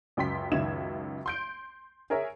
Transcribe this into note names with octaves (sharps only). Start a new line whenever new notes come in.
C#2 F#2 G5 C6 B6
C#2 F#2 D#3 E5 G#6 E7
C6 G6 D7
G#4 A#4 C#5 E5